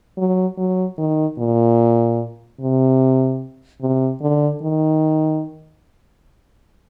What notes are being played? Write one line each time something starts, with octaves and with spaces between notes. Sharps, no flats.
F#3
F#3
D#3
A#2
C3
C3
D3
D#3